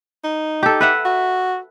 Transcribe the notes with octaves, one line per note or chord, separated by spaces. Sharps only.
D#4
G4 A4
B4 E5 F#5
F#4